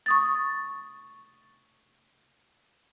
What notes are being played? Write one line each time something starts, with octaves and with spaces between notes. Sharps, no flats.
C#6 D#6 A6